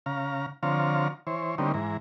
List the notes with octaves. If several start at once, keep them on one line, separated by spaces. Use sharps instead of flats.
C#3 F5 A#5
D3 F3 C4 C#5 F5 A#5
E3 C5 C#5
D3 G3 A#3 C4 C#4 D#4
G#2 E3 A#5